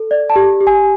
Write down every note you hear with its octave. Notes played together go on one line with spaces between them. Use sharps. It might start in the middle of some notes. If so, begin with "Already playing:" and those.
Already playing: A4
D5
A5
G4
G4
G#5